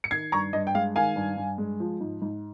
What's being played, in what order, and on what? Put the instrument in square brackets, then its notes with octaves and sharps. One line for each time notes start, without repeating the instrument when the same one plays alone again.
[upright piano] C#7
D#3 G#6 C7
G2 A#5 C#6
G2 D#5
G5
G#3 F5
D#3 F5 G#5
G2
G2
G#3
F3
G#2
G#2